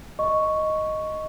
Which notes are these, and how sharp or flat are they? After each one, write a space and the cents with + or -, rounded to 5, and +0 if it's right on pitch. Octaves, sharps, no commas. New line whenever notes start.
D#5 +0 C#6 +0